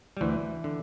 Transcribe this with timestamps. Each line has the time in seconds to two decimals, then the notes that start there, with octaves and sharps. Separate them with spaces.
0.17 G3
0.21 D2 E3
0.64 D3